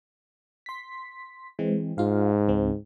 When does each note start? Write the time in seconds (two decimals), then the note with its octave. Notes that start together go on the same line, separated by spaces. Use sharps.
0.66 C6 B6
1.59 E3 G#3 C4
1.98 G#2 F4 F5
2.48 C#2 C4